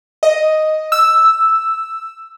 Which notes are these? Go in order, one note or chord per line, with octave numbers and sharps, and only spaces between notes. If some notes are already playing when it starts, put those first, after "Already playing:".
D#5
E6